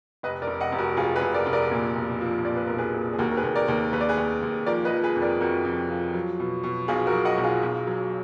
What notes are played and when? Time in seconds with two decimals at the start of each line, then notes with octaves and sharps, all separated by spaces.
0.23 F1 B4 D#5
0.42 A#4 D5
0.47 F1
0.60 D#5 F#5
0.72 F1
0.78 F#4 A#4
0.97 F1 F4 G#4
1.16 G#4 B4
1.22 F1
1.34 A#4 D5
1.47 F1
1.53 A#4 D5
1.71 A#2
1.96 B1
2.21 F3
2.44 A#2 D5
2.56 B4
2.67 B1 A#4
2.78 G#4 B4
2.94 A#2
3.13 G#4
3.19 D#2 F#4 A#4
3.31 A#4
3.37 G#4 B4
3.44 D#2
3.56 A#4 D5
3.68 D#2
3.93 D#2 B4
4.01 D5
4.09 G#4 B4
4.17 D#2
4.42 D#2
4.66 F3 A#4 D5
4.85 B4 D#5
4.91 F3
5.04 G#4 B4
5.16 F2
5.22 A#4 D5
5.41 F2 F#4 A#4
5.65 F2
5.90 F3
6.14 F#3
6.39 B2
6.63 B2
6.88 B1 F4 G#4
7.07 F#4 A#4
7.12 F#3
7.25 D#5 F#5
7.38 B1
7.44 F4 G#4
7.63 B1
7.87 F#3